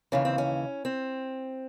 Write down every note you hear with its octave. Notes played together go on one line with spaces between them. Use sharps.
D#2 C#3 E3 C#4
C4
C#4
C4